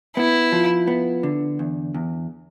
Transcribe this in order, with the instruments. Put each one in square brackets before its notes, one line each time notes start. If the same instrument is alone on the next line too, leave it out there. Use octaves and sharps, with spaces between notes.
[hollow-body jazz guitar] B3 [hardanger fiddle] E4
[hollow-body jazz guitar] F3
B3
D3
E2
E2